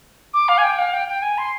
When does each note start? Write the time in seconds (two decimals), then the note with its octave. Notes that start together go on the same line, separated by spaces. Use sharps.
0.34 D6
0.48 F5
0.58 G#5
0.63 G5
0.79 F5
0.94 G5
1.08 G5
1.22 G#5
1.38 C6